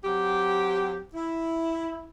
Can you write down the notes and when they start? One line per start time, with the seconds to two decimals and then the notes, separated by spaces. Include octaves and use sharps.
0.04 F#3 C4 G4
1.14 E4